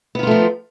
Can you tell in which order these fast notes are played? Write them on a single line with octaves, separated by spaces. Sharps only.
B3 D#3 F4 A3 F3